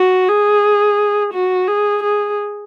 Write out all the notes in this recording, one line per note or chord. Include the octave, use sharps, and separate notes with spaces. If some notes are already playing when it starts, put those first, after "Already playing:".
Already playing: F#4
G#4
F#4
G#4
G#4